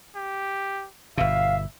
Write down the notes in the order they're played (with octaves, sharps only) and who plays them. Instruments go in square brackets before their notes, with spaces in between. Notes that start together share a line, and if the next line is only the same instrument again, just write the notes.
[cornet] G4
[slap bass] G1 B2 [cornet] E5 [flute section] F5